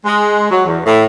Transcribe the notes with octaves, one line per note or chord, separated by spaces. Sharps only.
G#3
F#3
E2
A2